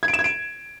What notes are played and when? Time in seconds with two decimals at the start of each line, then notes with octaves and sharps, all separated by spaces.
0.03 G#6
0.08 D7
0.13 E7
0.19 G#6
0.24 D7